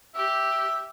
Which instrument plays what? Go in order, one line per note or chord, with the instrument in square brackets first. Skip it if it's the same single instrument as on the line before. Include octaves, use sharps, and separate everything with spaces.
[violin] G4 [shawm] E5